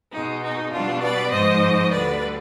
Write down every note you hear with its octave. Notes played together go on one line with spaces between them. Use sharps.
B2 G#3 D#4
D#4
B2 G3 D4 F4
B4 D5
G#2 F3 G#3 C5 D#5
D2 D3 G3 B4 D5